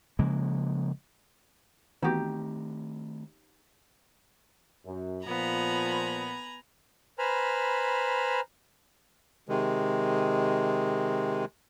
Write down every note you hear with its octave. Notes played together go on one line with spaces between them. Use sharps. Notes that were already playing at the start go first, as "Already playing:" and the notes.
C#3 F3 G#3 A#3
D#3 E3 A3 B3 C4 D#4 F#4 G4
F#2
A#2 F3 B3 G#5 A#5 B5
B4 C5 G#5 A#5 B5 F6
C3 D#3 G#3